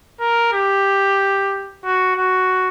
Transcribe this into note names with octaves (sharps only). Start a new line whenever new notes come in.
A#4
G4
F#4
F#4